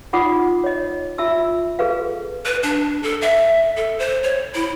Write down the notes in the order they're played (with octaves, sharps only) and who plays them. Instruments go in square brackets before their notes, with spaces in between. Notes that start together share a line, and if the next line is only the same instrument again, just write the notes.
[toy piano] D#4 F4 F#5 D6 D#6
C#5 D#5
F4 E5 A5 E6
G#4 A4 B4 F5
[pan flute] B4
D4
A4
E5
A4
C5
C#5
E4